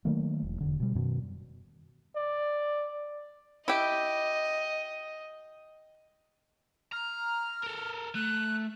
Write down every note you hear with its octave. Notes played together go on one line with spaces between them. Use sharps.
D#3 F#3 A3 A#3
E1
E1 D#2 D3
B2 G3
F#2 B2 D#3
D5
E4 G4 D#5
A#5 F6
A4 A#4
A3 F#6